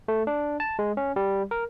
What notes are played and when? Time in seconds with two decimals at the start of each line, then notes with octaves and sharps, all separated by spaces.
0.08 A3
0.27 D4
0.60 A5
0.79 G#3
0.97 C#4
1.16 G3
1.51 A#4